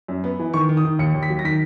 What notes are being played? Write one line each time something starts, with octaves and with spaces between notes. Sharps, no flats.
F#2
B3
E3
D#3 C#6
D#3
D#6
D#3
D#2 C#7
D#2
B6
F#3
A#6
D#3 B6